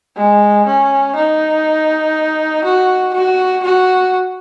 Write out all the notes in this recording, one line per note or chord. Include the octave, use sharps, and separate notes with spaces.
G#3
C#4
D#4
F#4
F#4
F#4